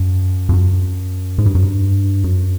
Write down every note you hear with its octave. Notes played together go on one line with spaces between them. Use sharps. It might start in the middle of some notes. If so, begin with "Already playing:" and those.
Already playing: F#2
F2
F#2
G#2
G2
F#2
G2
F#2